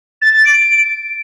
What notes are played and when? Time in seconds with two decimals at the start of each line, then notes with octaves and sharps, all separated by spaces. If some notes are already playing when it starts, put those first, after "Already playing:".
0.21 A6
0.33 A6
0.44 D7